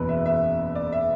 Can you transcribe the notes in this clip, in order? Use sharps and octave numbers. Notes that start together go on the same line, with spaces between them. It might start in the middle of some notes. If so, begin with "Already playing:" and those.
Already playing: F#1 E2 B2 B4
E5
E5
D5
E5